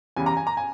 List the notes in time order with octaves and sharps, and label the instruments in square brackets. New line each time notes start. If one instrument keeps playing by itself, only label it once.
[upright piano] E2 C#3 G3 G#5
A#5
G#5
A#5
G#5